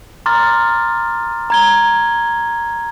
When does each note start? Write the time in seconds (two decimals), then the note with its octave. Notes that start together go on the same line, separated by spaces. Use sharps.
0.26 A#5 C6 D6 F6 A6
1.50 A#5 G#6 G7